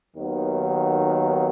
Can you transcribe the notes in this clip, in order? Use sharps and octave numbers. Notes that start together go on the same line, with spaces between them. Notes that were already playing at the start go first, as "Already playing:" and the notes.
D#2 D#3 F#3 B3